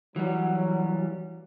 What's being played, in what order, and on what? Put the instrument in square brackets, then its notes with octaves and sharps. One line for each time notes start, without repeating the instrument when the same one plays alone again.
[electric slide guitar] E3 G3 [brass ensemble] F#3